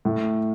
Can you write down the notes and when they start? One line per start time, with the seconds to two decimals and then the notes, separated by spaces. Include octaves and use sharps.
0.05 A2